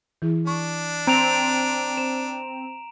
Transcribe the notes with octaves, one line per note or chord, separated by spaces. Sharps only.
E3 E4 G#4
D4 C#6
C4 A#5 D7 F7
C5 E7